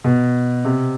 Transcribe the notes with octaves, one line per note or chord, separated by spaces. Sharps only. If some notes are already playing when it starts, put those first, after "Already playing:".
B2
C3